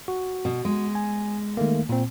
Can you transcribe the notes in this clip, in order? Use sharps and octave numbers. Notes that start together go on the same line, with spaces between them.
F#4
B2
G#3
G#5
D#3 A3 A#3
A#2 C4